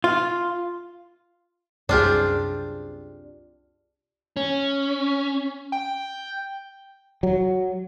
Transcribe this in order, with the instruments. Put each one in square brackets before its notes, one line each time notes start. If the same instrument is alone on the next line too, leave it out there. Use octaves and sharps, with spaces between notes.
[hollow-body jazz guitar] F4
[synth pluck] C2 F#2 [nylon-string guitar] C4 G#4 [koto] D4 F4 G4
[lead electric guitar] C#4
[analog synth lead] G5
[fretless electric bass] F#3